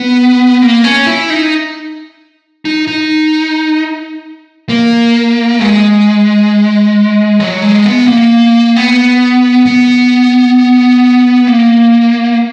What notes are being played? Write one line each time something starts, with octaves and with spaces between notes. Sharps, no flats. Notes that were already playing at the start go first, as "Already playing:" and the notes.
Already playing: B3
A#3
C#4
E4
D#4
D#4
D#4
A#3
G#3
F#3
G#3
B3
A#3
B3
B3
A#3